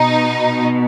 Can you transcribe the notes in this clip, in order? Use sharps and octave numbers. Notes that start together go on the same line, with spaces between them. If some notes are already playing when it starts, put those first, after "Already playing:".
Already playing: B2 D#4